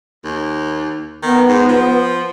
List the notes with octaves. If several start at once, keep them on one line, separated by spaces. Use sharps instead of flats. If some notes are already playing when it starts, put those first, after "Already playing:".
D#2
D#3 B3
G#2
F3